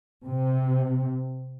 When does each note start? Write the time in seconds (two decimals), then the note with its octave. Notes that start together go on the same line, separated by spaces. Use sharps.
0.25 C3